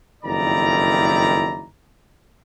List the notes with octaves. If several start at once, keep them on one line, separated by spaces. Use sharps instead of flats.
F#1 F2 D#3 E4 D5 A#5